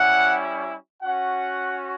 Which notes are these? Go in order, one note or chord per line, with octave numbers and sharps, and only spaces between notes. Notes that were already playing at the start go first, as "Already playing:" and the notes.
Already playing: G3 C#4 E4 F#5
C#4 F#4 F#5